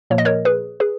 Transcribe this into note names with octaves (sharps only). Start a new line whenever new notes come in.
A#2 F3 A#3 C#5
D#5
A#4 C#5
G#4 B4
G#4 B4